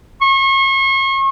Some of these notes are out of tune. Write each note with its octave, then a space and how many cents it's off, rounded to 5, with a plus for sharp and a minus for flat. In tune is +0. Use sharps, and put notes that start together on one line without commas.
C#6 -40